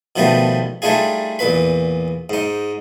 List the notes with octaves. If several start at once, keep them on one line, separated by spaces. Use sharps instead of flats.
B2 D#3 F3 G3 A3 B3
G3 A3 D4 D#4 F4 G#4
E2 A#2 B4 B5
G#2 D#4